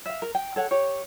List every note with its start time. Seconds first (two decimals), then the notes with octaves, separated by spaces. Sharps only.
0.06 E5 F5
0.22 A#4
0.35 G5
0.56 A4 C#5 F#5
0.71 G4 C#5